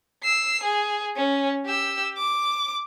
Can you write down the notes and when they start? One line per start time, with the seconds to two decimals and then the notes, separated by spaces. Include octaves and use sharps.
0.23 E6 C7
0.64 G#4
1.16 C#4
1.66 G4 E6
2.17 D6